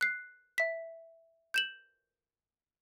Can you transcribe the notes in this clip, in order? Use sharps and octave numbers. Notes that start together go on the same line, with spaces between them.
F#6 C7
E5 B6
G6 E7 F#7